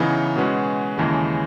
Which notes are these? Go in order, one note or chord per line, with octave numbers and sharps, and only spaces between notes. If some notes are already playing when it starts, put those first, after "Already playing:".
Already playing: C#3 E3 B3 D#4
B2 G#3 C#4 F#4 B4
D#2 C#3 E3 G#3